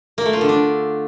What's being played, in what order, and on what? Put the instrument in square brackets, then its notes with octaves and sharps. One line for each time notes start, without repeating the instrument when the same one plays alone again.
[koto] A#3
A3
F4
D3
D4